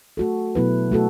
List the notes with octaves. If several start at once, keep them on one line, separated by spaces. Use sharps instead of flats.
A3 F#4 A4
B2 F#3 B3 E4 B4
A3 F#4 A4